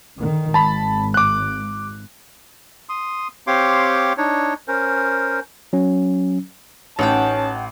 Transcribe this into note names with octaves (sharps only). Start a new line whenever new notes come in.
D3 D#3
G#1 A5 B5
D6 F#6
C6 D#6
C4 G4 C#5 F5 C6 D6
D4 D#4 C#5
C#4 A#4 C5
F#3 C#4
A1 C#4 D#4 F#5 G5 A5